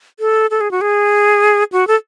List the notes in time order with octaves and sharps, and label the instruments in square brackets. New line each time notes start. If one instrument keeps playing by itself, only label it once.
[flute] A4
A4
G#4
F#4
G#4
F#4
A4